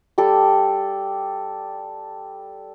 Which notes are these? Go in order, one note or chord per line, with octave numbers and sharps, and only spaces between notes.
G3 G4 A4